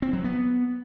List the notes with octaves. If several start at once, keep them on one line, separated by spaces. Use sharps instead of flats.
C4
F#3
B3